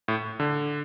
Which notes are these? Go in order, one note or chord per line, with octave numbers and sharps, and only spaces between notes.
A2
D3